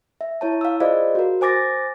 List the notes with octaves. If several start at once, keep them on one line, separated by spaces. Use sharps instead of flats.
E5
E4 C#5 A5
F5 E6
F4 G#4 C5 D5 D#5 F5
F#4 A#4
C5 G#5 D6 A6 A#6